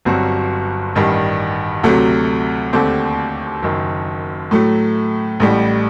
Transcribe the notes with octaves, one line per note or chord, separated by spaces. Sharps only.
G1 G2 F#3 C4 F#4
A1 G2 D#3 G3
D2 C3 F#3 A3
D#2 D3 A3 C4 G4
F#1 F#2 D#3
A2 F#3 A3
A1 A2 G3